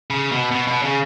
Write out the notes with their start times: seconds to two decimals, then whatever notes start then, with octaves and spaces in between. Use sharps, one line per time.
0.10 C#3
0.32 B2
0.52 B2
0.68 B2
0.83 C#3